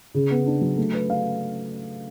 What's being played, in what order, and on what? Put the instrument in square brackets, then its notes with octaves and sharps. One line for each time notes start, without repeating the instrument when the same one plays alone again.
[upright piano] C#3
B3
D4
F#3
A3
B4
F5